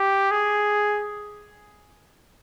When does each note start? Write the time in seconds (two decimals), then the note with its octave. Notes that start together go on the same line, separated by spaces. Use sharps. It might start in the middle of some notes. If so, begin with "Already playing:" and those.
Already playing: G4
0.31 G#4